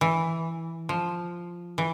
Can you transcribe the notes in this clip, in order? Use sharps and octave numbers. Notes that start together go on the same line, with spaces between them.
E3
F3
E3